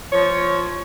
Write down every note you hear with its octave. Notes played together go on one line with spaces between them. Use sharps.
F3 C#5